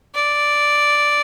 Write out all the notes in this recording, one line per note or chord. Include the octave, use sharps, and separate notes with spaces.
D5